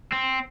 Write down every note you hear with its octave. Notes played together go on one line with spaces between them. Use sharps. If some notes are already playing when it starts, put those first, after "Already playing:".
C4